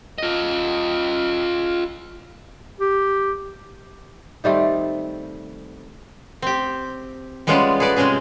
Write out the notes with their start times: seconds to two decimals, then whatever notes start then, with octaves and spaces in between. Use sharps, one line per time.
0.18 F4 D#5
2.80 G4
4.44 D#3 G3 A3 C4
6.42 C4 G4
7.47 G3 G#3 B3 C#4 F4 D5
7.80 G#4 A4 B4 D5
7.96 C3 G#3 C4 C#4 G#4